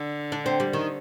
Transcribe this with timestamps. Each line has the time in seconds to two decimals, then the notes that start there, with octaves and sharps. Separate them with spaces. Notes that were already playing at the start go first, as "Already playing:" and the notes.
Already playing: D3
0.32 D4
0.46 C4
0.60 G3
0.73 D#3